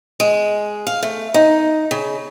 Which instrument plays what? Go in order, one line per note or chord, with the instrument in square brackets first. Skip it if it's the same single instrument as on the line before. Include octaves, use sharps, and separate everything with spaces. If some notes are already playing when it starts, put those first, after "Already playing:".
[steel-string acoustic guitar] G#3
F5
A3
D#4
C#3